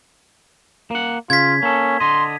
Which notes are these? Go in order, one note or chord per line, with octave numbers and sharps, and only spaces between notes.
A#3 F#5
C#3 F4 G#6 B6
A#3 C#4 A4
D3 D#5 C6